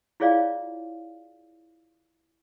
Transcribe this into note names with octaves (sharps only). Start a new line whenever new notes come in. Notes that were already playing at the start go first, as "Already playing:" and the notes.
E4 F4 G#4 C#5 D5 F5